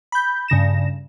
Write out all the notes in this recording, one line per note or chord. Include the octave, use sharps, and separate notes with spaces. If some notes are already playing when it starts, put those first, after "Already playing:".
B5 G6
G2 C#3 A#6 E7